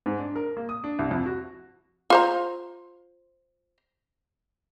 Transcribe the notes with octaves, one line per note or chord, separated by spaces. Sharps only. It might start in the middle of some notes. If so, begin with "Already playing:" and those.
G#2
D4
A#4
A#3
D#6
D4
C2
F2
F#4
F4 C5 A#5